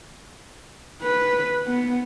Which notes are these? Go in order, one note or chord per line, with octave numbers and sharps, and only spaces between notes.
B4
B3